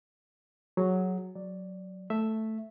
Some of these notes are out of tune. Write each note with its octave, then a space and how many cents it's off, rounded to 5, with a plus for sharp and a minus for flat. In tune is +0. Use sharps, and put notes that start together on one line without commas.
F#3 +0 G#4 +0
F#3 +0 D5 +0
A3 +0 E5 +0